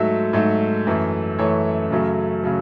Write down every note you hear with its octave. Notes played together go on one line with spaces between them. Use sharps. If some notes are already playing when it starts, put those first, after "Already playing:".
Already playing: G#2 F#3 A3 E5
G#2 F#3 A3
F#2 E3 A3
F#2 E3 A3 C#5
F#2 C#3 F#3 A3
C#3 F#3 A3